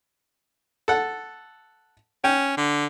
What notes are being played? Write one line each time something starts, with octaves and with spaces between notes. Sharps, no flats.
A4 F#5
C#4 G5
D3